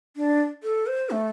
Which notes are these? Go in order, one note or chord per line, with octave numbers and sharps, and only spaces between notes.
D4
A4
C5
A3